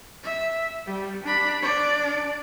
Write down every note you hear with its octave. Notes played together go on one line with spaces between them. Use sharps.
E5
G3
D4 B5
D4 D5